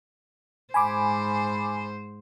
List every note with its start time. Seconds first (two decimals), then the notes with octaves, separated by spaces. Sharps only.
0.74 G#2 C5 G#5 B5 D6